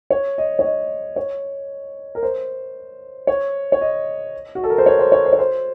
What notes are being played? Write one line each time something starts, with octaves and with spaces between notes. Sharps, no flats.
C#5
D#5
C#5
D#5
C#5
A#4
C5
C#5
C#5
D#5
F#4
A4
A#4
C5
C#5
C5
C#5
C5
C#5
C5